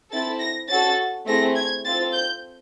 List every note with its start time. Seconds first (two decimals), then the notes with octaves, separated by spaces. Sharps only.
0.11 C4 E4 A4 A6
0.40 A#6
0.69 C#4 F#4 A4 A6
1.26 A3 C4 E4 G#4 A#6
1.56 G#6
1.85 C4 F4 A4 A6
2.14 G6